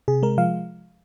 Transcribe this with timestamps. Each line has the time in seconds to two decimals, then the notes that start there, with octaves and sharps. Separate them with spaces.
0.08 C3 G#4
0.23 G#3 A#4
0.38 F3 F5